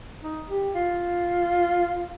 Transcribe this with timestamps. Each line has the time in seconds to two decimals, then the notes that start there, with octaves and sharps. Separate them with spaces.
0.23 D#4
0.49 G4
0.75 F4